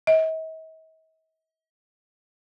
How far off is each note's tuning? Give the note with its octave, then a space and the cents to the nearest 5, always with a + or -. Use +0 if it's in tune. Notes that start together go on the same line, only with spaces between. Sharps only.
D#5 +45